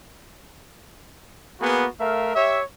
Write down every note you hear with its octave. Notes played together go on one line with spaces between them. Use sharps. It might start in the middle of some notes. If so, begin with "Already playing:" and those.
A#3 B3 F#4 G#4 B4
A3 A#4 E5 F5
G4 C#5 E5